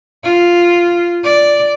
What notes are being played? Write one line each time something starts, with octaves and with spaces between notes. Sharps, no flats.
F4
D5